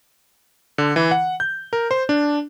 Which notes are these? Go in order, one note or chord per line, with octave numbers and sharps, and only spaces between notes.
D3
E3
F#5
G6
A#4
C5
D4